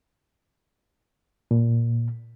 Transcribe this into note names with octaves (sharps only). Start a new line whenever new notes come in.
A#2